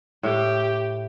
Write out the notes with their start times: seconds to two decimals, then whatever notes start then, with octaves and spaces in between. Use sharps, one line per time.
0.23 A2 G4